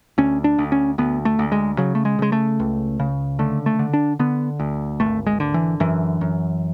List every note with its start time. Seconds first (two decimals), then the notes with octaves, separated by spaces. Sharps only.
0.18 D2 C#4
0.44 D4
0.58 D2
0.72 C#4
0.98 D2 B3
1.25 A3
1.39 D2
1.52 G#3
1.78 C#3 F#3
1.95 A3
2.05 G#3
2.19 C#3 G#3
2.32 A3
2.60 C#2
3.00 C#3
3.39 D3 A3
3.66 A3
3.79 D3
3.94 D4
4.19 D3 B3
4.60 D2
5.00 G#1 A3
5.27 G#3
5.40 D3
5.54 E3
5.80 F#2 E3
6.21 F#2